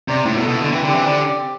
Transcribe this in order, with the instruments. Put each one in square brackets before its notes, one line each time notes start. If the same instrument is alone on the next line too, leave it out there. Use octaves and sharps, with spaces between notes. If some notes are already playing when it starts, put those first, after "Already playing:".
[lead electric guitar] C3 [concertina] D5
[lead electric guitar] A2 [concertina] E4
[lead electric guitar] B2
[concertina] A4
[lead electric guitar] B2
[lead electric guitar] D3 [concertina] E4
[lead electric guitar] E3 [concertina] C4
[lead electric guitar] D3 [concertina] G4
[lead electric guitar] E3
[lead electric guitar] D3 [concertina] D5
[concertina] G4
C4